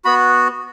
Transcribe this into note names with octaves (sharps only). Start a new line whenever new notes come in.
B3 F#4 B5